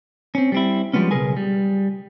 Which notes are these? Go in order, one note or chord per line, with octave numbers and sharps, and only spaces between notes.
C4 C#4
G3 C4 E4
F3 G3 G#3 B3 C#4
B1 C#3 G#4 A#4 B4 G#5
G3